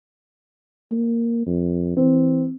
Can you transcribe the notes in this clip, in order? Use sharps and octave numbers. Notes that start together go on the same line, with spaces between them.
A#3
F2
E3 C4